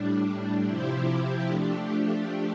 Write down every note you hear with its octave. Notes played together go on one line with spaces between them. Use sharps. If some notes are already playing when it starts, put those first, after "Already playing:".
Already playing: A2 G3 D4
C3 F3 C4 E4 G4
F3 A3 D4 G4